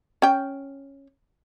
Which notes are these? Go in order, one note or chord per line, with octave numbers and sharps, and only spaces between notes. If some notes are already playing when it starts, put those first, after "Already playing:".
C#4 G5